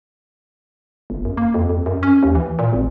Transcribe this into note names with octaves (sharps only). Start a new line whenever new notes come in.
G1
F#2
A#3
F2
F2
F#2
C#4
D#2
E3
A#2
G#1